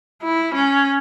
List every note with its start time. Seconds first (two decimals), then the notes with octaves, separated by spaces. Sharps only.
0.23 E4
0.54 C#4